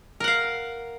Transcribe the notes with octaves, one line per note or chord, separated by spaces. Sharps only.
A#4 F5 F#5